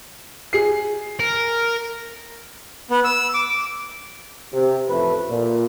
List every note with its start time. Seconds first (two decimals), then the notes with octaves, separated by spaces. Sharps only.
0.53 G#4 C7
1.20 A#4
2.91 B3
3.04 E6
3.34 D6
3.50 D6
4.52 C3
4.88 A1 F2 A3 B4
5.29 A#2